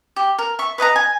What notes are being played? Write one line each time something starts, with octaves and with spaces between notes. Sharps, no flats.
G4
A#4
E5 C#6
B4 D#5 F#5 A#5
G#5